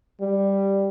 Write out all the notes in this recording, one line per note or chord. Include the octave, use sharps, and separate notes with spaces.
G3